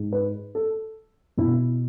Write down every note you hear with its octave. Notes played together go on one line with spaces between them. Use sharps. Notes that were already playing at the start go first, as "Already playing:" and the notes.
Already playing: G#2 G#3
B4
A4
B2 E4